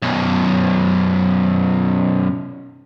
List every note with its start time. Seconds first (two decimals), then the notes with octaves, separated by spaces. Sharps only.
0.02 B1 F#2